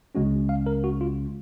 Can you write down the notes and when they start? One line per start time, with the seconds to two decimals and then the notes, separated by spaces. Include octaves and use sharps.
0.15 C#2 C#3 G#3 C#4 F#4
0.49 F5
0.66 A#4
0.84 F#4
1.01 F4